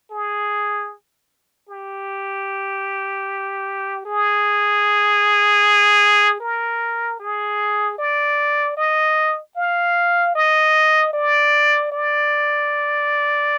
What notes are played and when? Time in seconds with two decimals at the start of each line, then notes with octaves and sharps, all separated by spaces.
0.11 G#4
1.69 G4
4.05 G#4
6.40 A#4
7.19 G#4
7.98 D5
8.77 D#5
9.56 F5
10.35 D#5
11.13 D5
11.92 D5